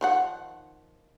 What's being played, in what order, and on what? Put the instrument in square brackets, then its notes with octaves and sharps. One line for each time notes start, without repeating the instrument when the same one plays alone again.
[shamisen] D#3 F3 F#5